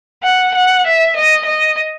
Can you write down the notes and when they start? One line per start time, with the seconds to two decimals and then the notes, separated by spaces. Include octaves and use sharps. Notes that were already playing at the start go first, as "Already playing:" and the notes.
0.24 F#5
0.54 F#5
0.85 E5
1.15 D#5
1.46 D#5